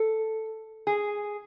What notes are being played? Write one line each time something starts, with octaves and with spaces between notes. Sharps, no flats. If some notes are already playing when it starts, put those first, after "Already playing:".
Already playing: A4
G#4